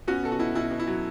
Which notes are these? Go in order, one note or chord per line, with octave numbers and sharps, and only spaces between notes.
B3 C#4 F#4
B2 A4
F#4
B2 E4
B2 E4
B2
E4
F#3